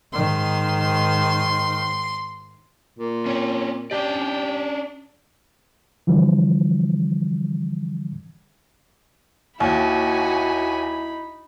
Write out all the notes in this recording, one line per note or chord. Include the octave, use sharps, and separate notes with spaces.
G#2 D#3 C6
A#2
C4 C#4
C#4 D4 G4 D5
D3 E3 F3 G3
D#2 D#4 E4 F#4 G#5 B5